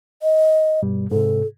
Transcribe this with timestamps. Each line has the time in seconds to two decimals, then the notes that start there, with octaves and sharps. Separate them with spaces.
0.22 D#5
0.82 G2 B2 G3
1.11 G#2 C3 A4